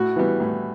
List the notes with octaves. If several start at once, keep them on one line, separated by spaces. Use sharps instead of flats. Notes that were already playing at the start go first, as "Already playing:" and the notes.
Already playing: A2 F#4
E3 G3 B3
A2